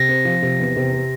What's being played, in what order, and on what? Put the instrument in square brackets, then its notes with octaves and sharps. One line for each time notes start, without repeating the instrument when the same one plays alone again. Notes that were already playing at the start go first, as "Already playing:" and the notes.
Already playing: [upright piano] C3 [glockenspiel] A#6
[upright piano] C4
F3
C3
E2
C3
C4